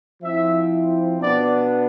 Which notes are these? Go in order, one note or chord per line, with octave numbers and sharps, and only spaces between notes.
F3 C4 E4 E5
B2 B3 D4 D5